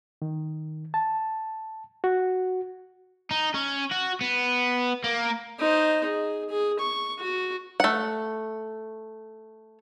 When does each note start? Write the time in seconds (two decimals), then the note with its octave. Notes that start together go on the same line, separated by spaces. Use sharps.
0.22 D#3
0.94 A5
2.04 F#4
3.31 D#4
3.54 C#4
3.91 F#4
4.21 B3
5.04 A#3
5.59 D#4 C5
6.06 G#4
6.50 G#4
6.79 C#6
7.19 F#4
7.80 A3 F#5